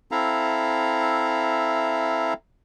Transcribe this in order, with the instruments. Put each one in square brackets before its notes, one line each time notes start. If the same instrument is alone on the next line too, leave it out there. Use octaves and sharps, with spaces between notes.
[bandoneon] C4 E4 A4 E5 F5 A#5